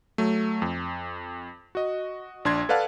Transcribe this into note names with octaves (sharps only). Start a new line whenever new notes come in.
F#3 A3
F2
F#4 D#5
A#1 D4 C6 G#6
A4 B4 D5 F5 F#5 A5